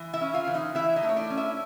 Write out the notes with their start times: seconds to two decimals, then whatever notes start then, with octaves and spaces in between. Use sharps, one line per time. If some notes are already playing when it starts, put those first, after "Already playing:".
Already playing: E3
0.13 E4 E5
0.21 C#4
0.34 F4 F5
0.47 E3
0.54 D#4 D#5
0.75 E3 E4 E5
0.96 D#4 D#5
1.03 A3
1.09 C#5
1.16 D4 D5
1.30 C#4
1.37 E4 E5